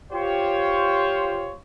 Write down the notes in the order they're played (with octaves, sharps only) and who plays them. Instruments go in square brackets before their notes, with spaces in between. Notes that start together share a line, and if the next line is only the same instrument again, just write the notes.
[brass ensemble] F4 G4 C5 C#5